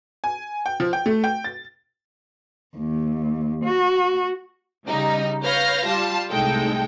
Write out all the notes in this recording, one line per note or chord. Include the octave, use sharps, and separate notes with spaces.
G#5
G5
F3
G5
A3
G5
A6
D#2
F#4
C#3 G3 D#4
B4 C#5 F5 F6 G6 A#6
G3 F4 F5 A5
C2 A2 G#3 D#4 A4 G5